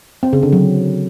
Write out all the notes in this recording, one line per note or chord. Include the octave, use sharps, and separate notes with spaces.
C4
C#3
D3
F#3